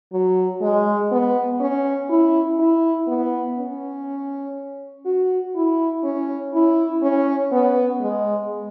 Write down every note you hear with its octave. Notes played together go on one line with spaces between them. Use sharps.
F#3
G#3
B3
C#4
E4
E4
B3
C#4
F#4
E4
C#4
E4
C#4
B3
G#3